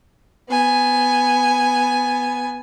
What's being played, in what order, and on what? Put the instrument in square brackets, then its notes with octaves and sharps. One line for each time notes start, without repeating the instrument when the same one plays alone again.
[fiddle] B3 G#5